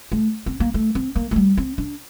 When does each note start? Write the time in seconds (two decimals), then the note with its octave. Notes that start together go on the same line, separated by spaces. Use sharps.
0.12 A3
0.46 C4
0.60 A#3
0.74 A3
0.95 C4
1.16 A#3
1.31 A3
1.36 G3
1.57 C4
1.78 D4